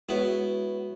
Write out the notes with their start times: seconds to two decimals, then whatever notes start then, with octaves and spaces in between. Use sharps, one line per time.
0.09 G#3 B3 E4 F#4 C#5